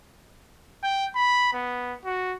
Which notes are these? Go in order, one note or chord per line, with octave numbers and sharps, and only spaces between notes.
G5
B5
B3
F#4